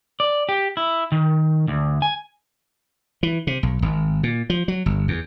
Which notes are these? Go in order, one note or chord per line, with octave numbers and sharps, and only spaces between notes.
D5
G4
E4
D#3
D2
G#5
E3
C3
B1
G#1
A#2
F3
F#3
G1
E2